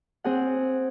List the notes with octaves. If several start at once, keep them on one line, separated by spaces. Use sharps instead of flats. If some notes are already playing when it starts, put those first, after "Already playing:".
C4 G#4 F#5